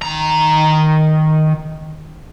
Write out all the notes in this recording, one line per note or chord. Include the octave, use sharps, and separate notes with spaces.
D#3 A#5